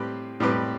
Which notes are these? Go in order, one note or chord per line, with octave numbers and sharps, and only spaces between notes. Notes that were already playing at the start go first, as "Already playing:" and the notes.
Already playing: A2 G3 C4 G4 B4
A2 G3 C4 G4 B4